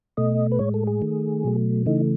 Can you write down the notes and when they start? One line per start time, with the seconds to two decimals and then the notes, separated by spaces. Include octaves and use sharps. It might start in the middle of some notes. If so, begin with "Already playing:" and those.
0.17 B2 A3 D#5
0.52 B4
0.59 A2 G#3 C#5
0.74 A4
0.87 G#4
1.02 D#3 A3
1.44 B2 F#3 A3
1.86 C#3 E3 A3 D#4